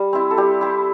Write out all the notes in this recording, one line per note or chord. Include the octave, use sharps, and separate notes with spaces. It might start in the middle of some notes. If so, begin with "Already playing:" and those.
Already playing: G3
C4 E4
A4
G3 G4
C4 E4